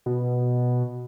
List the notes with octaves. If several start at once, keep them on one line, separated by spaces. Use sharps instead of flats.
B2